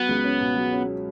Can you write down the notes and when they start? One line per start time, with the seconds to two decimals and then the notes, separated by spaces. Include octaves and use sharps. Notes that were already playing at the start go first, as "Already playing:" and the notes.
Already playing: F#3 B3
0.09 C#2
0.24 C#4
0.40 B2
0.56 F#3
0.73 C#4